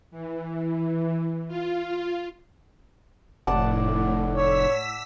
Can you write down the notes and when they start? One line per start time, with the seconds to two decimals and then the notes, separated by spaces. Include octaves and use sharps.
0.11 E3
1.48 F4
3.47 F1 A2 D5 F#5 A5
4.34 C#5 E6 B6